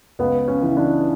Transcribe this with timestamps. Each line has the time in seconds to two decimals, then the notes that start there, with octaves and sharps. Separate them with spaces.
0.19 C#2 B3
0.48 C#4
0.62 C#3 E3
0.77 D4